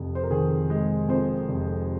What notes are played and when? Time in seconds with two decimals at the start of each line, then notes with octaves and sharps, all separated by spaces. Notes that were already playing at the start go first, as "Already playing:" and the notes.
Already playing: F1 F2
0.15 C5
0.23 A#4
0.31 D#3 G#4
0.70 G#3
1.08 F2 C5
1.49 F1